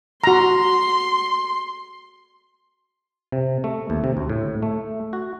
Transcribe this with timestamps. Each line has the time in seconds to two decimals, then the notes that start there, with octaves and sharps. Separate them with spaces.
0.24 F#4 A#5 C6
3.32 C3
3.64 A3
3.90 D#2
4.04 C3
4.17 D2
4.29 A2
4.63 A3
5.13 F#4